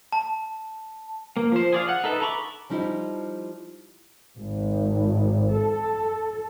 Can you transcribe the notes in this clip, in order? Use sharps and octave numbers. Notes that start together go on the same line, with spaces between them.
A5
A#3
F3 C5
G#4 D5 F5
F#5
D#4 A4 B4 E5
A4 A#5 B5 C#6 D6
F3 G3 D#4 E4
G#1
A4